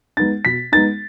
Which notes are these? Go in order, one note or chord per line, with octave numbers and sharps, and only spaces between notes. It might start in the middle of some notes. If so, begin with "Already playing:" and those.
G#3 B3 D#4 A6
B2 B6
G#3 B3 D#4 A6